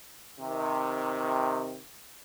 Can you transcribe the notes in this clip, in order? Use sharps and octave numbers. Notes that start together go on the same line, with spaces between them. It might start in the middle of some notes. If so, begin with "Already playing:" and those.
C3 D#3